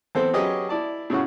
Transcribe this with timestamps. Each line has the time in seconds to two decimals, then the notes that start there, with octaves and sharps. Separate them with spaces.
0.15 E2 C4 A4 C5
0.33 F#3 C#4 G4 G#4 B4 D#5
0.69 E4 D5 A5
1.10 A2 C#3 C#4 F#4